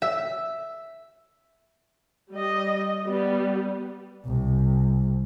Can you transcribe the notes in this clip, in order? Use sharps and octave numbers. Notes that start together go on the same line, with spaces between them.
E5
G3 D#5
G3 B3
C2 C3